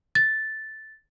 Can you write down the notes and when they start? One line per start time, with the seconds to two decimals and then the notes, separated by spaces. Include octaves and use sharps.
0.15 A6